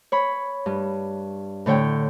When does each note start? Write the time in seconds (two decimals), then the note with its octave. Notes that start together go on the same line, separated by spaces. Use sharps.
0.12 C#5 B5
0.66 G2
1.66 A2 D3 C#5 G5